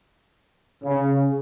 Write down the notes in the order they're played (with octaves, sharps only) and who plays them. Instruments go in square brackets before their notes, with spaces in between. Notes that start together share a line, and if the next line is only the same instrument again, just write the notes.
[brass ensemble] C#3